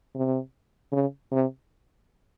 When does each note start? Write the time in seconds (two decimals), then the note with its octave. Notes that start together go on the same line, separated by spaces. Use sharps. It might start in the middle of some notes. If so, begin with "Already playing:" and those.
0.15 C3
0.93 C#3
1.32 C3